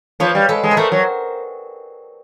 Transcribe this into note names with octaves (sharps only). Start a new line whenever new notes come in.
F3 B4 C#5
G3
G#3 A4 B4
G#3
B4
A3 A#4 C5
F#3